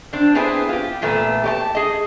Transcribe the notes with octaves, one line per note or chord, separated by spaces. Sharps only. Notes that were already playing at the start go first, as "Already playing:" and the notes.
C4 D4
B3 C4 E4 G#4 B4
F4 G4
E2 A#2 A3 B3 B4
G4 D5 A5
G#4 D#5